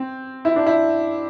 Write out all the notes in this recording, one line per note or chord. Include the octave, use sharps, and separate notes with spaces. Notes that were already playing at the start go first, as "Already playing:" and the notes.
Already playing: C4
E4
D4
E4